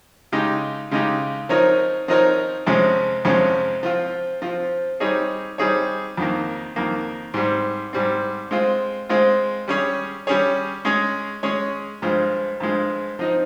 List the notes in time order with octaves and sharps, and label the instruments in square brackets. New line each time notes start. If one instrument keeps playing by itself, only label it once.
[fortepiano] C#3 G#3 D#4 G4
C#3 G#3 D#4 G4
F3 C4 D#4 A#4 C#5
F3 C4 D#4 A#4 C#5
F2 C3 F3 G#3 C#4
F2 C3 F3 G#3 C#4
F3 C4 F4
F3 C4 F4
G3 C4 D#4 G#4 C#5
G3 C4 D#4 G#4 C#5
F2 D#3 A#3
F2 D#3 A#3
G#2 G3 C4
G#2 G3 C4
G#3 C4 F4 C5
G#3 C4 F4 C5
G3 C#4 G#4 C#5
G3 C#4 G#4 C#5
G#3 C#4 G#4 C#5
G#3 C#4 G#4 C#5
G2 F3 G#3
G2 F3 G#3
F3 C4 D#4